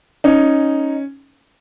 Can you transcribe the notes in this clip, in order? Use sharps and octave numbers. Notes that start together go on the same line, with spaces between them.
C#4 D#4